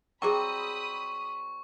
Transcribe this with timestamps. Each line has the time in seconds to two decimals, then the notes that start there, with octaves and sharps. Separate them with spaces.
0.22 F#3 G3 C4 G#4 G5 B5 C#6 D#6